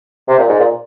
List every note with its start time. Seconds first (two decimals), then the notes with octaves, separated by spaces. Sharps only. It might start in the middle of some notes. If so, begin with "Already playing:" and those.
0.28 C3
0.39 A#2
0.49 G#2
0.60 A#2